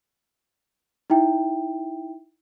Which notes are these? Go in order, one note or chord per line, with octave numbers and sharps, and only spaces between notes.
D#4 E4 E5 G5